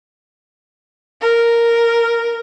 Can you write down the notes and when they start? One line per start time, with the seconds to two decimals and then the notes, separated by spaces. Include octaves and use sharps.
1.22 A#4